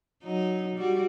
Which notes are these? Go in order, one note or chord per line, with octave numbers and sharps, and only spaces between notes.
F#3 D#4
G3 F#4